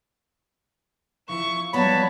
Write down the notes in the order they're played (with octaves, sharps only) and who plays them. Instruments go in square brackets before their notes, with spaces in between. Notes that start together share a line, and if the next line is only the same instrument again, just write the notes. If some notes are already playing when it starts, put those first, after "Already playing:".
[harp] F3 [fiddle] E4 C#6
[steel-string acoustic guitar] F#3 G3 B3 [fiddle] C#5 A5 [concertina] B5